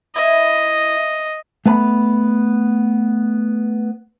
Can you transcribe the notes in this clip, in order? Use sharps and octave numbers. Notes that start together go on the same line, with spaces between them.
E4 D#5
A3 B3 A5 B5